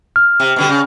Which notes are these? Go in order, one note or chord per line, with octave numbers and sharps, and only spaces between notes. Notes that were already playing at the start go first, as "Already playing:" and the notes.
F6
C3
B2 D3 G3
C#3